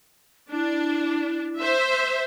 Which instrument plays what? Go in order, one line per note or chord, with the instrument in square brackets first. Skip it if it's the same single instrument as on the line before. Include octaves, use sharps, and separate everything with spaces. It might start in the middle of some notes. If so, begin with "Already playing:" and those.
[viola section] D4 [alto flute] E4
[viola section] C5 E5